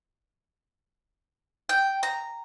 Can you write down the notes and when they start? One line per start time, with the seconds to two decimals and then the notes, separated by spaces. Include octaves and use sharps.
1.69 G5
2.03 A#5